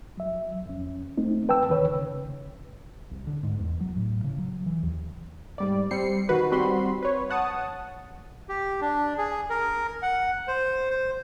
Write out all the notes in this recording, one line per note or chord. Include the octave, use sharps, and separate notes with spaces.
F#3 E5
F2 C#4
A3 C4 D#4
B4 G5 A5 E6
D2 D#3 B4 C#5
C#3
C2
D3
G#2
E2
F#3
A2
C#3
F#3
E3
D#2
G#2 G3 D5
G3 C4 C7 C#7
D#3 F#4 B4
G3 C4 F#4 B5 C6
B4 C#5
C#5 F#5 A5 D#6
G4
D4
G#4
A#4
F#5
C5
C5